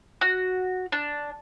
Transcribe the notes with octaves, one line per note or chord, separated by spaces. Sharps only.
F#4
D4